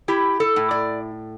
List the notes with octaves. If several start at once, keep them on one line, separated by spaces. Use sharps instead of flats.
E4 G4
A4
A2
D5